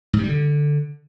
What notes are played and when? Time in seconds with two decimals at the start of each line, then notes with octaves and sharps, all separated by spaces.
0.13 G#2
0.19 C3
0.24 G3
0.29 D3